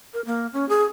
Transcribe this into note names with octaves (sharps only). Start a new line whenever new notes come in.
A#4
A#3
C#4
G#4